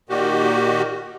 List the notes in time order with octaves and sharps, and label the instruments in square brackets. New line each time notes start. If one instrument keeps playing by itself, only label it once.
[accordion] A#2 D#3 F#4 G4